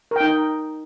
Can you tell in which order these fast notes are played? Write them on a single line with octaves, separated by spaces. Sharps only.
A#4 G5 D#4